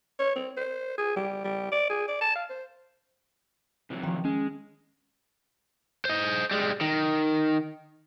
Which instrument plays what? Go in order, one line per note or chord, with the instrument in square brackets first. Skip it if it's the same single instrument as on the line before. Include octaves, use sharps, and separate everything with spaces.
[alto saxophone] C#5
C4
C5
G#4
G3
G3
D5
G#4
D5
A5
F5
C5
[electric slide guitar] C3 E3 F#3
[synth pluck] D#3 F3
[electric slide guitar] G#3 [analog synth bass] C#4
[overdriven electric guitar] C5 D#5
G3 G#3
D#3